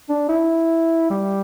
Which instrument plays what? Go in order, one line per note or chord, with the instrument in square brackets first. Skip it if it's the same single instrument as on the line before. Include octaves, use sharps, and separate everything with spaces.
[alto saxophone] D4
E4
G3